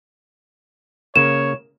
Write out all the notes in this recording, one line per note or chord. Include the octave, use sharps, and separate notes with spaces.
C#3 A#3 C#5 E7